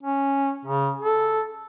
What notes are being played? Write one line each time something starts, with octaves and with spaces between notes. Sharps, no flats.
C#4
C#3
A4